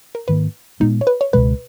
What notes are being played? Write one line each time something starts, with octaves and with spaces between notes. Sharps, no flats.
A#4
G#2 D#3 A#3 B4
A#2 G#3 B3 D#4
C#5
B4
C#5
C#2 B2 G#3 B4